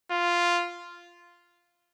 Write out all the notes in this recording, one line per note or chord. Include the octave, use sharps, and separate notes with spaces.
F4